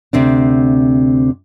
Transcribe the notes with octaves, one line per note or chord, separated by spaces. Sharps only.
D2 C3 C4 D4